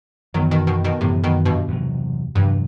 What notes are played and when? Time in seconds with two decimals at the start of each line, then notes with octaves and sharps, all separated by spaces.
0.34 F#2 D#3 E3 F#3 B3
0.51 B2 D#3
0.67 B2 D#3
0.84 B2 D#3
1.01 F#2 A2 C3 E3 B3
1.24 B2 D#3
1.45 G2 B2
1.68 E2 C3 F#3
2.35 E2 G2 C3 F#3